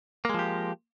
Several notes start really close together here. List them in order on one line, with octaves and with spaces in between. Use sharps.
A#3 G#3 F3 G4